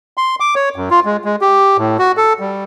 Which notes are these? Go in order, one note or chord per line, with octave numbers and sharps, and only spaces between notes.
C6
D6
C#5
F#2
F4
G#3
G#3
G4
A2
F#4
A4
G3